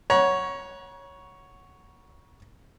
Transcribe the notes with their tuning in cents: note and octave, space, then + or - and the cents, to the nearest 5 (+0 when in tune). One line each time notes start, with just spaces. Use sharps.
C#5 +0 F#5 +0 A#5 +35